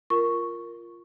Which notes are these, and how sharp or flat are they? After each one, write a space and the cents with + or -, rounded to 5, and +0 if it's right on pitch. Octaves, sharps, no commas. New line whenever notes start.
F4 -5 A#4 +0 C#6 +0